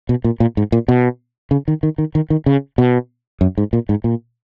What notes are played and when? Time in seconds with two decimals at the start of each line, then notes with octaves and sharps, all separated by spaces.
0.09 B2
0.24 A#2
0.40 A#2
0.57 G#2
0.72 A#2
0.88 B2
1.51 C#3
1.68 D#3
1.83 D#3
1.98 D#3
2.15 D#3
2.30 D#3
2.46 C#3
2.78 B2
3.41 F#2
3.58 G#2
3.73 A#2
3.89 G#2
4.04 A#2